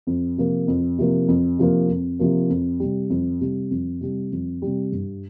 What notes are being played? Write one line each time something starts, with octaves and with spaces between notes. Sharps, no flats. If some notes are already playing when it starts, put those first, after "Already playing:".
F2
C3 F3 A#3
F2
C3 F3 A#3
F2
C3 F3 A#3
F2
C3 F3 A#3
F2
C3 G3
F2
C3 G3
F2
C3 G3
F2
C3 G3
G2